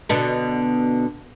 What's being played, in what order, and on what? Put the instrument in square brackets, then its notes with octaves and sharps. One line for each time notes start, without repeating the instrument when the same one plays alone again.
[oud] B2 D3 B3